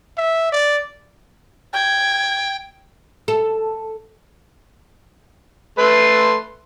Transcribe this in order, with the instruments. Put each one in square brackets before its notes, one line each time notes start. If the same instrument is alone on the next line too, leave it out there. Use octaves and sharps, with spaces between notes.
[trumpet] E5
D5
[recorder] G5 [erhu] G#6
[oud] A4
[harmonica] A3 B4 C6